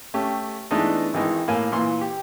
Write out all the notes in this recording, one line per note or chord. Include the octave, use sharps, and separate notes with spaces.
A3 C#4 G4
E3 G#3 A3 B3 D4 D#4
G#1 D#3 E3 G#3 D#4
A2 A#3 G#5
A#2 E3 C6
G4